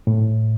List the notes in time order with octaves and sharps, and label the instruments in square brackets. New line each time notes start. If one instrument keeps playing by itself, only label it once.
[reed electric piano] A2